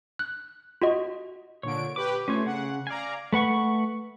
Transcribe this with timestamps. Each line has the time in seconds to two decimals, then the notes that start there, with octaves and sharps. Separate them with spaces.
0.19 F#6
0.82 F4 F#4 D#5
1.63 A#2 D3 C#5 D7
1.96 G4 B4 D6
2.28 A3 C#4 F4 C#5
2.46 C#3 F#5
2.87 D5 F5 G#5 A#5
3.33 A3 B4 F#5 C#6